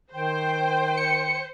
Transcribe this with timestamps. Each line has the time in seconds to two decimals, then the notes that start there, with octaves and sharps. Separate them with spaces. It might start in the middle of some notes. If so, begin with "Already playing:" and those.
0.13 D#3 C5 G5
0.97 C#7